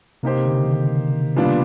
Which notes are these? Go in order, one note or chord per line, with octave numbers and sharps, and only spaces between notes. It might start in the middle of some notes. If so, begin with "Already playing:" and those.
C3 A#3 D#4 G4 C5
C3
D3
C#3
D#3
A#2 G3 B3 D4 F4